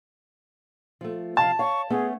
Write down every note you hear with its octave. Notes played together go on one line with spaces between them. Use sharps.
F3 A3
C3 F3 F5 A5
C#5 F5 C#6
A3 B3 C#4 G#4